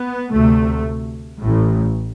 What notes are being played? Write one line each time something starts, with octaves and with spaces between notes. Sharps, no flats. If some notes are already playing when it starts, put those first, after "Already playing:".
Already playing: B3
D2 C3 A3
A2
A1